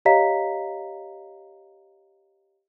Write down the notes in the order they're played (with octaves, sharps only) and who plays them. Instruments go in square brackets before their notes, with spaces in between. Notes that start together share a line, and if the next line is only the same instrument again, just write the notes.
[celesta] G4 C#5 D#5 F5 A#5 B6